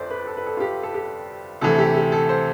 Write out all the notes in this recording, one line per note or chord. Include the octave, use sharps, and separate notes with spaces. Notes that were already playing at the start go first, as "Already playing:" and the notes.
Already playing: G1 F2 C5 D5
B4
A4
B4
A4
F4
G4
A4
G4
D2 C3 E3 A3 A4
A4
G4
G4
A4
C5